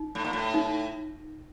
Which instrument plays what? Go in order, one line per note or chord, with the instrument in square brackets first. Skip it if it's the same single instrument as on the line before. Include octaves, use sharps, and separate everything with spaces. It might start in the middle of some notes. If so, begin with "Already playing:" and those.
Already playing: [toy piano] D#4
[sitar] A2
A#2
A2
[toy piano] D#4